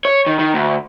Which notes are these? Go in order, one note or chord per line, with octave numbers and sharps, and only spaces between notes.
C#5
D#3
D#3
D2